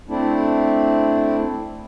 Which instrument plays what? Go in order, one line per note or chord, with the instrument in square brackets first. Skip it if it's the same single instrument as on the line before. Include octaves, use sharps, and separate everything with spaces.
[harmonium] A3 C4 D4 E4